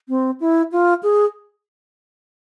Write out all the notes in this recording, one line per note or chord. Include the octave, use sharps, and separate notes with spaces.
C4
E4
F4
G#4